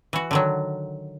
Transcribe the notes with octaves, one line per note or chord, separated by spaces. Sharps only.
E3 F#4
D3 D#3 F#3